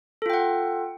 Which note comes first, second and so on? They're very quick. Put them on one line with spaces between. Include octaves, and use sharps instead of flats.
A4 F4 G5 F#5